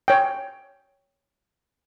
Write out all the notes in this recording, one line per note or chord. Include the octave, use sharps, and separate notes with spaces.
C#5 G5